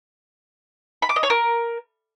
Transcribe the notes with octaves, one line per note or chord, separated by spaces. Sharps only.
B5
D6
D#5
C#5
A#4